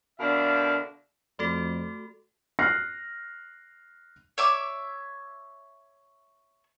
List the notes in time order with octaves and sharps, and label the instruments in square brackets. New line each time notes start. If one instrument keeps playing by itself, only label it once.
[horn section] B2 D3 D4 A#4 E5 F5
[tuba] F2 [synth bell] A3 F#4 A4
[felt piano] F6 F#6 A#6 C7
[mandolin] C#5 E5 D6